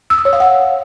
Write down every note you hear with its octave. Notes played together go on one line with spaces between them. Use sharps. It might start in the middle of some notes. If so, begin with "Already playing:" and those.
E6
D#6
C#5
F5
F#5